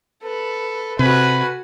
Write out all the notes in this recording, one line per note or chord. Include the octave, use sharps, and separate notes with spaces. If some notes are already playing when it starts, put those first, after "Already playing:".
A4 B4
C3 F#4 B4 G#5